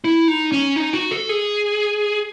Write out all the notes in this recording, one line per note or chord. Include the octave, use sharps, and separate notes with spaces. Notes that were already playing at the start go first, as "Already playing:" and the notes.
E4
D#4
C#4
D#4
F#4
A4
G#4